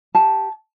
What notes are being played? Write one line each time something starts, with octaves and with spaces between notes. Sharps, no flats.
G4 A5